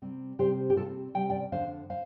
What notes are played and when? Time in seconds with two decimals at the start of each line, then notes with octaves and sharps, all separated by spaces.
0.02 C3 G3 C4
0.39 C3 G3 C4 G4 C5
0.70 G4
0.76 C3 G3 C4 F4 A4
1.14 C3 G3 C4 G5
1.30 D5 G5
1.52 F2 D3 F3 C5 F5
1.90 C5 F5